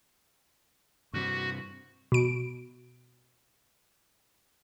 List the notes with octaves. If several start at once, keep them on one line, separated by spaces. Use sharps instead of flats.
G2 C3 F#4
B2 D7